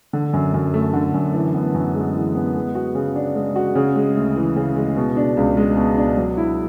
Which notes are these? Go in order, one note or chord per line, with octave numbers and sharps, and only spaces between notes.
D3
F#2
F#2
A3
D3
F#2
E3
B3
F#2
G#3
E3
B3
G#3
F#4
C#3
D4
G#3
F#4
C#3
G#3
D2
E3
C#3
G#3
B2
D4
C#2
G#3
B2
D4
F#3
E4